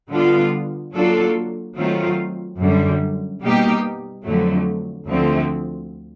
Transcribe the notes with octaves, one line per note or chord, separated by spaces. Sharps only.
D3 G3 B3 D4 F4
F#3 A#3 D4 F4 A4
D#3 F#3 A3 C4 F4
F#2 D3 G3
B2 G3 A#3 D#4 G4
F2 D3 F#3 A3
D2 D3 F3 A3 C4